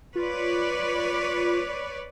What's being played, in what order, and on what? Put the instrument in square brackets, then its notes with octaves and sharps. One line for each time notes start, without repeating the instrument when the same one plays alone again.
[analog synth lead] F4 [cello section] B4 C#5 D5